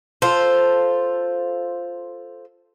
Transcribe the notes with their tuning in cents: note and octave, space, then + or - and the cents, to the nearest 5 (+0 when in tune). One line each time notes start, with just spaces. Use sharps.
F4 +0 A4 +0 C5 +0